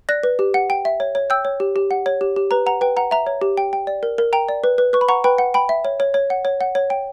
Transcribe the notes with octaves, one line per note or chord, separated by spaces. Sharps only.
D5 F#6 A#6
B4
G4
F#5
G5
E5
C#5
C#5
G5 E6 G6
C#5
G4
G4
F#5
C#5
G4
G4
B4 A#5
F#5 A#5
B4 G5
F#5 A#5
E5 A#5
C#5
G4
G5
G5
D5
A#4
A#4
G5 A#5
D5
B4
B4
B4 C#6
B5
F#5 A#5 C#6
B4 G5 B5
F#5
G5 B5
E5
C#5
C#5
C#5
F#5
C#5
F#5
C#5
G5